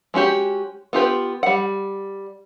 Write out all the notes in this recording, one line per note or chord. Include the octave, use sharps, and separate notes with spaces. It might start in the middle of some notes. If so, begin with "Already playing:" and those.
G#3 C#4 F#4 G4
B3 F4 G4 B4
G3 F#5